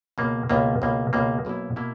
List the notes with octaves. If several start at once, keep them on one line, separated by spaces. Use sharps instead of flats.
C#2 B2 A#3
C#2 B2 A#3
C#2 B2 A#3
C#2 B2 A#3
B1 B2 A#3 E4
B2 A#3 E4